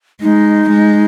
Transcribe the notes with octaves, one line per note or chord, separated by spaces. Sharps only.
G#3 D#4
G#3